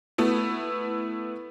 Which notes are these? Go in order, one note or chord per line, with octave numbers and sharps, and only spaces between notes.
A3 B3 E4